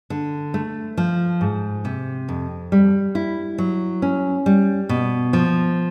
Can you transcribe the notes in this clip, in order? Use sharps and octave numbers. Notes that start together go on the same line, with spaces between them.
D3
A3
F3
G#2
C3
F2
G3
E4
F#3
C#4
G3
B2
F3